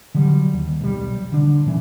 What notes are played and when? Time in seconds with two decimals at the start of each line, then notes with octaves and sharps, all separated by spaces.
0.15 D3 F#3 G3
0.53 D#2
0.81 B1 G3
1.32 D3 D4
1.66 A#2 E3 C#4